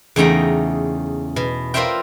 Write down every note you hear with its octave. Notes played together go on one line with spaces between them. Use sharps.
E2 C#3 A3 D#4 G5 A#5
B2
F4 A#4 C5 D5 E5 G5